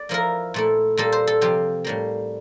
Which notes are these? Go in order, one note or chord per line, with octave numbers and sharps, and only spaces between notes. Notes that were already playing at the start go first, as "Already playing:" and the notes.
Already playing: D5
F3 A#3 E4 A#4
A#2 A3 E4
A#2 G3 A#3 A4
C5
A4
C3 F3 C4 G4
A2 G3 A#3